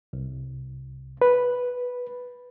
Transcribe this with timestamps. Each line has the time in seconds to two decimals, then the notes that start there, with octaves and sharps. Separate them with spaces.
0.13 C2
1.22 B4